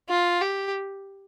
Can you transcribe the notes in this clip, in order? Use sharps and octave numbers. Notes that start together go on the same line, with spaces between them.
F4
G4